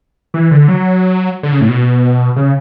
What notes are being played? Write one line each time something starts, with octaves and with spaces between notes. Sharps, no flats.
E3
D3
F#3
D3
C#3
A2
B2
C#3